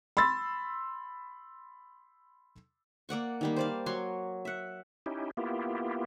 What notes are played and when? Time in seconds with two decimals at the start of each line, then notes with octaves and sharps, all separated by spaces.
0.17 B5 C6 E6 A6
3.09 A#3 D5 F#5 C#6
3.41 D#3 G3 A#3
3.56 C5 D5 F5
3.86 F#3 C#5 C6
4.45 E5 F#5
5.06 C#4 D#4 E4 G4
5.37 A#3 B3 E4 F4 G4